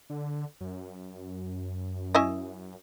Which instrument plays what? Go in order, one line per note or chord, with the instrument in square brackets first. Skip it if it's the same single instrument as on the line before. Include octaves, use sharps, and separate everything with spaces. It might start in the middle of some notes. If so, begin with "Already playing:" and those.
[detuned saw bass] D3
F#2
[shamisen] C#4 E4 D#5